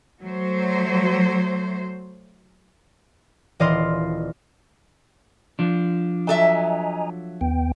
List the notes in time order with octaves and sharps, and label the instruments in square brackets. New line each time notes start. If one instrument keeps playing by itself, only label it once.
[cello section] F#3 A3 C5
[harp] D#1 E3 D5 D#5 F5 C6
[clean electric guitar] F3 D4
[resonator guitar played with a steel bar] F#3 A4 E5 [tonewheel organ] D#5 G#5 A#5
[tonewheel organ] D#2 B3 G5